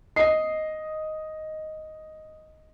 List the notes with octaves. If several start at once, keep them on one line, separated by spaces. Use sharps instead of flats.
D#5 C7